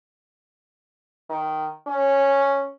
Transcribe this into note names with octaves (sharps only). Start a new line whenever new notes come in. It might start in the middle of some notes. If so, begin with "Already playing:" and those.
D#3
C#4